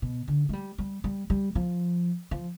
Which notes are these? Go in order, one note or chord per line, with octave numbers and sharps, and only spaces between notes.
B2
D3
G#3
G3
G3
G3
G3
F3
F3